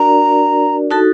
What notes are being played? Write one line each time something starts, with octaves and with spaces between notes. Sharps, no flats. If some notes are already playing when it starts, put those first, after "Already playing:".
Already playing: D4 F#4 A#4 D5 A#5
D#4 F#4 A4 A5